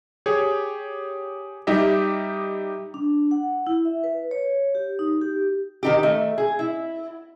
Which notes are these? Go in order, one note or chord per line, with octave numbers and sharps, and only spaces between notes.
G4 G#4 C#5
G3 D#4 G4 D#5 E5
D4
F#5
E4
E5
B4
C#5
G4
D#4
G4
D#3 D#4 G4
A3
G#4
E4